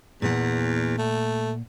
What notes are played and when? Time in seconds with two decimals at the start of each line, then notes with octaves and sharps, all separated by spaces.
0.22 E2 A#2 F#5
0.98 A3